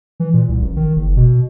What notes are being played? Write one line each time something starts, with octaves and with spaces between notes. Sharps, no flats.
E3
A#2
C2
A1
D#3
F#1
B2